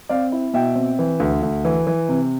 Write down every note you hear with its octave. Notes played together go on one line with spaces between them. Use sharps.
C4 D5 F5
E4
B2 E5 G5
C4
E3
D2
D2
E3
E3
C3